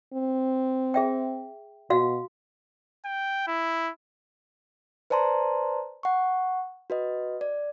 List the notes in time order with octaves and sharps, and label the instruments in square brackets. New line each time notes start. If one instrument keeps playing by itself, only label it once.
[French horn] C4
[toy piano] G#4 E5 G5
[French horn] B2 [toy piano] F#4 F5
[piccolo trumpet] G5
E4
[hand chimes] B4 C5 D5 A5 A#5 C6
F#5 C#6
F#4 B4 D#5
D5